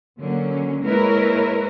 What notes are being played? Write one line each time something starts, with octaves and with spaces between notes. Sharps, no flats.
D3 F#3 A#3 C#4
G#3 A#3 E4 A#4 B4 C#5